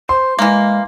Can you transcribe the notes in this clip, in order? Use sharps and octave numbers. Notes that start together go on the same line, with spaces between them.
C5 C6
E3 G#3 A#3